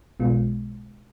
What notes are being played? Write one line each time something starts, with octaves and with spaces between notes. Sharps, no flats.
B1 B2 G#3 B3 F4